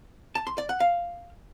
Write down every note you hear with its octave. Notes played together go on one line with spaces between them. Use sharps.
A5
C6
D5
F#5
F5